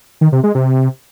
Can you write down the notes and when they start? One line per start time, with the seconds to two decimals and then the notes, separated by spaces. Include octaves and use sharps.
0.21 D#3
0.32 C3
0.44 G#3
0.55 C3